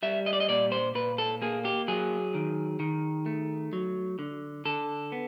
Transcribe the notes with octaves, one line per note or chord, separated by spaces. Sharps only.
G3 E5
D#5
D5
D#5
A#2 D5
C5
A#2 B4
A4
A#3 G#4
G4
F#3 G#4
D#3
D#3
A3
F#3
D3
D3 A4
B3